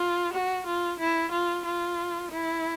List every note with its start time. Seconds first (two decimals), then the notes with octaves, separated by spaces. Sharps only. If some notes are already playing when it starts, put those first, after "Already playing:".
Already playing: F4
0.33 F#4
0.66 F4
1.00 E4
1.32 F4
1.65 F4
2.31 E4